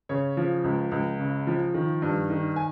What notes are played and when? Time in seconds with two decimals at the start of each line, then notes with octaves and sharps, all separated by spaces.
0.09 C#3 C#5
0.37 F3
0.64 C#2
0.92 C#2
1.19 C#3
1.47 F3
1.74 D#3
2.02 G2
2.30 D#3
2.56 G#5